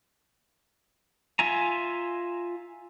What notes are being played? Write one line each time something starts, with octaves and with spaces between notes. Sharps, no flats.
F4 E5 G#5 A#5